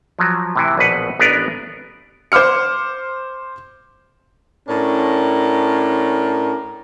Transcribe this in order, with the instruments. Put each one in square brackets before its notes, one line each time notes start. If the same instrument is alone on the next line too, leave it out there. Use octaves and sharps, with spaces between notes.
[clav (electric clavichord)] F3 F#3
A2 C3 E3
A#1 B2 B4 F#5
A1 B3 D4 A#4 B4 D5
[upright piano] C5 C6 D6 F6 C#7
[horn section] A2 C#4 D4 A#4